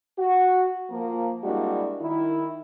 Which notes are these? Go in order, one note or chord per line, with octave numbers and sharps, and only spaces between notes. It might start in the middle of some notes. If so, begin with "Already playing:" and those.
F#4
F3 A#3
G3 G#3 A#3 D4 E4 F#4
D#3 E4